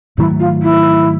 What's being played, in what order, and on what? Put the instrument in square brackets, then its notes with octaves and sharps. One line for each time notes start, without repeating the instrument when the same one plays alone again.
[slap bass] G#2 D#3 F#3 A3 [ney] E4
[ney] F4
E4